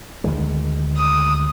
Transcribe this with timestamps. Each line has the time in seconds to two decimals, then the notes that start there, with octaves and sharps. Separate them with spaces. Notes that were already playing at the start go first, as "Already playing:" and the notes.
0.24 D2 D#3 G#3
0.97 D#6